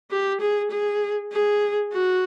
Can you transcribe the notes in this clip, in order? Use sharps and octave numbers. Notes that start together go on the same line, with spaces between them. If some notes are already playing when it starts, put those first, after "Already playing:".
G4
G#4
G#4
G#4
F#4